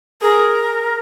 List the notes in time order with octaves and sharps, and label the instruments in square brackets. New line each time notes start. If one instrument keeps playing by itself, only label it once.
[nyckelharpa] G#4 [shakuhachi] A#4